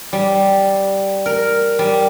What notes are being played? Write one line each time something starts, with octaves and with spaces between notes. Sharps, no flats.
G3
A#4
G3